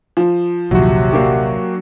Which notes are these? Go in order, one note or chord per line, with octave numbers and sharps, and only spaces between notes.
F3
A#1 D#2 C3 F#3 F#4
A#3 D4 G4